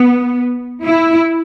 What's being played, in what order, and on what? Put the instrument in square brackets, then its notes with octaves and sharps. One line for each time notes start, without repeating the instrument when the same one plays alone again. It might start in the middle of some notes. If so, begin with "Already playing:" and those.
Already playing: [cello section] B3
E4